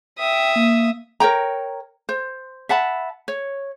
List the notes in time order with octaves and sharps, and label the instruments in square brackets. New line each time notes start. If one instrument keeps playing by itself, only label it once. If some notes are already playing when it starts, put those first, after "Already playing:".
[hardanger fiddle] E5 D#6 [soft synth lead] G5
[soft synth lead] A#3
[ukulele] A#4 C#5 G5 A#5
C5
E5 F#5 A5 B5
C#5